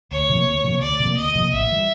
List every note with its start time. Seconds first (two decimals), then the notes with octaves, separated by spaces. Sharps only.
0.11 D2 C#5
0.29 C3 F3 A#3
0.47 D2
0.64 C3 F3 A#3
0.81 D2 D5
1.00 C3 F3 A#3
1.17 D2 D#5
1.35 C3 F3 A#3
1.53 A1 E5
1.72 E3 G3